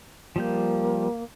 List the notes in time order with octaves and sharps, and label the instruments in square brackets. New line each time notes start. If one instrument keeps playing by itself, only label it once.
[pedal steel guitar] F3 G3 G6 [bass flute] A#3